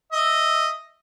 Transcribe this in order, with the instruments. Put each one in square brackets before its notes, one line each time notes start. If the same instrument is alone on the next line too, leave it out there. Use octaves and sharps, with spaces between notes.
[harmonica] D#5 E5